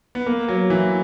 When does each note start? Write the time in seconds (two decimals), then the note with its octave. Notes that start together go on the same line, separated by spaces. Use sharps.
0.15 B3
0.27 A#3
0.49 F#3
0.70 E3